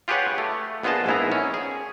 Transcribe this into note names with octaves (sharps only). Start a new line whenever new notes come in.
F4 G4 G#4 B4 C#5 F#5
A3
A#1 B3 F4 G#4 D#5 A5
A#1 G#2 B3 E4 G#4 A#5
C#4
G#4